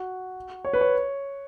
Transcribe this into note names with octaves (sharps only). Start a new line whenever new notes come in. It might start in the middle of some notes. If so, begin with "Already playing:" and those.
Already playing: F#4
C#5
B4
C#5